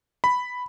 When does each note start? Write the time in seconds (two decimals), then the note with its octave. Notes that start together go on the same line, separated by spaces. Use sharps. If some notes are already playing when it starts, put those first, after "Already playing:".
0.24 B5